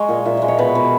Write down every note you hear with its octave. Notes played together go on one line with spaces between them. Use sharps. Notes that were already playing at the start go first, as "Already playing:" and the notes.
Already playing: G#3 C#5 D#5
A#2
A#2 E5
G#3 D#5
C#5
B2 B4
B2